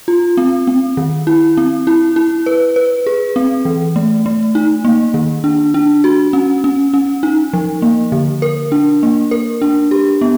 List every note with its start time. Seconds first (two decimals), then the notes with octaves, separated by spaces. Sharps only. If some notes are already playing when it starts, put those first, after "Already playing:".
0.08 F4
0.37 C4
0.67 C4
0.97 D#3
1.27 E4
1.57 C4
1.87 E4
2.16 E4
2.46 B4
2.76 B4
3.07 G#4
3.36 C4
3.65 E3
3.96 A3
4.26 A3
4.55 D#4
4.85 A#3
5.14 D#3
5.44 D4
5.74 D4
6.04 F#4
6.33 C#4
6.64 C#4
6.94 C#4
7.23 D#4
7.53 F3
7.82 A#3
8.12 D3
8.42 A#4
8.72 D4
9.03 A#3
9.31 A#4
9.62 D4
9.91 G4
10.21 B3